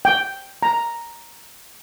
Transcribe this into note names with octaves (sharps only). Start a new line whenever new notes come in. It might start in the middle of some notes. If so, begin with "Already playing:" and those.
G5
A#5